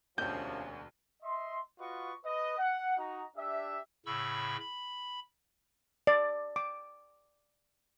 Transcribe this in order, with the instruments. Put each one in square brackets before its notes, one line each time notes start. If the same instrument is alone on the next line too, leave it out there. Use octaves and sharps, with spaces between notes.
[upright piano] E1 D2 [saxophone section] C3 A#3 C#4 [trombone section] F3 [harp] G6
[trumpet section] D#5 E5 C6
F4 F#4 B4 D#5 C#6
B4 D#5
F#5
D#4 F#4 D#5 A#5
D4 G4 E5
[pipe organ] A2 C#3 B5 C#6 E6
B5
[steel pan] D5
D6